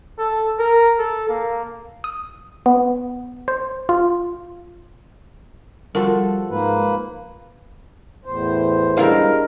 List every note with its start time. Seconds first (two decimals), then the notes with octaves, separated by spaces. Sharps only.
0.19 A4
0.59 A#4
0.99 A4
1.29 A#3
2.04 D#6
2.66 B3
3.48 C5
3.89 F4
5.95 F3 G3 F#4 A4 A#4
6.50 G#2 A#3 B4
8.25 E2 A2 C5
8.98 G3 G#3 D4 E4 A#4 F5